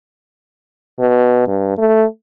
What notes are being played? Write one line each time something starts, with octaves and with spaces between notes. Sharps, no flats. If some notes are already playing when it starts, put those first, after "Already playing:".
B2
G2
A3